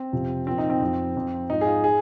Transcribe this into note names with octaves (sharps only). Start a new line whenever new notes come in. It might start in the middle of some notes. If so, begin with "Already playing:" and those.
Already playing: C4
F2 C3 F3
A#2 F3 C4
D#4
C4
F2 F3
F2 F3
G#2 F3 D#4
G#4
F4
G#4